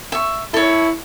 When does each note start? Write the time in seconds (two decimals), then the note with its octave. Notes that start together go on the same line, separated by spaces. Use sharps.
0.12 E5 C#6
0.54 E4 A4 C#5